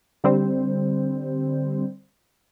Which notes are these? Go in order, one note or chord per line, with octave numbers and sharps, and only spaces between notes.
D3 G3 C4 C5